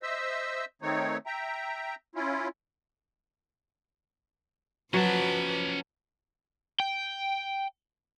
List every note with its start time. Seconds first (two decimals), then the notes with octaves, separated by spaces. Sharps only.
0.03 C5 D#5 E5 E6
0.82 D#3 A3 C4 D#4 C#5
1.26 E5 G5 A#5
2.15 C#4 E4 F4
4.94 F3 F#3 C#4 B4 A5
6.80 G5